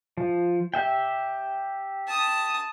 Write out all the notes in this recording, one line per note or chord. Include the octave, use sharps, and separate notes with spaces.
F3
G4 E5 G5
A5 D#6